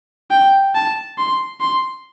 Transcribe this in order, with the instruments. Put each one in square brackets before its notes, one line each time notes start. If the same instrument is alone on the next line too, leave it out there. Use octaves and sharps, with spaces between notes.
[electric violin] G5
A5
C6
C6